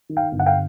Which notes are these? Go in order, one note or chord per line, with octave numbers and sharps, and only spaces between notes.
D#3
F5 G5
G1
F#5
F5 G5